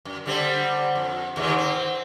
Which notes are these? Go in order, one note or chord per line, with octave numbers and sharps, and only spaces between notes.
F#2
D3 G3 C4
F2
D#2 G#2 D#3
C4